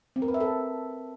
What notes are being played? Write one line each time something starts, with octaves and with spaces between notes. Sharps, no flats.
C4
A#4
B4
E5
A4